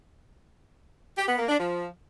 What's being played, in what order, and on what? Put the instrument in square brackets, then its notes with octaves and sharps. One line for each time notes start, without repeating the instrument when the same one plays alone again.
[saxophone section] G4
B3
A#3
D4
F3